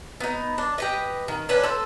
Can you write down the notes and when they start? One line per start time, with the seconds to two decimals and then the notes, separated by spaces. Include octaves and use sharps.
0.20 B3 D#4
0.58 D4
0.78 G4 B4 D#5
1.28 D#3
1.49 C#4 D4 B4
1.63 A4 C5